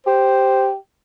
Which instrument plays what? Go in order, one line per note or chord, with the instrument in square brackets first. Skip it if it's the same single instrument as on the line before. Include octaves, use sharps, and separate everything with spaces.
[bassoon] G4 [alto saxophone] C5